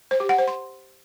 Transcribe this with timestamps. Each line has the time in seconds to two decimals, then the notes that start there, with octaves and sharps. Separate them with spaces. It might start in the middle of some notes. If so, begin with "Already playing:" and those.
0.11 C5
0.20 G4
0.29 F#5
0.38 C5
0.48 C6